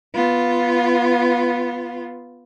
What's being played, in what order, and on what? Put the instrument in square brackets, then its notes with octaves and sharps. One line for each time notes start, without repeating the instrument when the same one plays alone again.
[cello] B3 F4